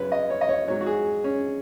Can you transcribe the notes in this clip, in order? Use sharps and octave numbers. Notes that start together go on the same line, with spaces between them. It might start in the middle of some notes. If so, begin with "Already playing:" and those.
Already playing: F#2 C#3 F#3 B4 C#5
D#5
C#5
D#5
C#5
G#2 F#3 C#5
F#4
G#4
C#4